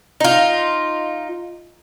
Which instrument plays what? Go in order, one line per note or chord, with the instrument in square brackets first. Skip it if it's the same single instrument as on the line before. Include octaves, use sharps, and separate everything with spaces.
[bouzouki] D#4 F4